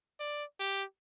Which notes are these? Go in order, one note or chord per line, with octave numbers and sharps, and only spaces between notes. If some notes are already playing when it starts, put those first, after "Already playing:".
D5
G4